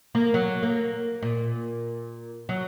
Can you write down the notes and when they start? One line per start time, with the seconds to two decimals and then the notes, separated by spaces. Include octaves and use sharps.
0.15 A#3
0.34 F#3
0.63 A#3
1.22 A#2
2.49 F#3